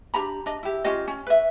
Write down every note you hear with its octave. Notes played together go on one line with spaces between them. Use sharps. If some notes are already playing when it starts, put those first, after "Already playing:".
D4 G4 A#5 B5
D4 D#5
E4 G4
C#4 F4 G4 D#5
C#4
B4 E5